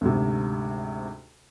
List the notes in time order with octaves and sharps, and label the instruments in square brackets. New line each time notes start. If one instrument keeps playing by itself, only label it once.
[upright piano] D2 G#2 C3